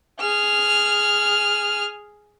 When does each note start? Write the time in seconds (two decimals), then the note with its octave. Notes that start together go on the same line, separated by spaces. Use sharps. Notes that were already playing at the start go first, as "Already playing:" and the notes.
0.21 G#4 F6